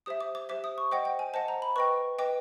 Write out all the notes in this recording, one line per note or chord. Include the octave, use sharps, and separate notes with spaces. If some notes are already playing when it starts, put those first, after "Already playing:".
G4 C5 E5 D#6
D6
D6
G4 C5 E5 D6
D#6
C#6
C5 D#5 F#5 G5
G5
G#5
C5 D#5 F#5 A5
A#5
B5
B4 D#5 G5 C#6
B4 D#5 G5 D6